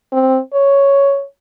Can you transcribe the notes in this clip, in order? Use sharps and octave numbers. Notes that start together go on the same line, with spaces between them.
C4
C#5